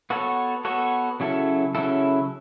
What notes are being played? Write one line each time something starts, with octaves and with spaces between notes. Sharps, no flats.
B3 F#4 A4 C#5
B3 F#4 A4 C#5
C#3 F#3 C#4 E4 A4
C#3 F#3 C#4 E4 A4